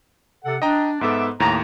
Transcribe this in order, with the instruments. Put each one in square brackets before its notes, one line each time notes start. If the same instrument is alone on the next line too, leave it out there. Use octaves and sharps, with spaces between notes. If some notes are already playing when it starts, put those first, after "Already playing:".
[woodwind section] C3 A4 F#5
[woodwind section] D4 [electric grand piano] D#5 G5 A#5
[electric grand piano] G#2 B3 A4 [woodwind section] E5 D6
[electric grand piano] D#2 A2 [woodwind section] A#3 A#5